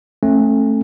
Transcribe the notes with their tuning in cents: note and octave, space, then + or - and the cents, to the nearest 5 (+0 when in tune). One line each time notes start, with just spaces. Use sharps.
A3 +0 C#4 -35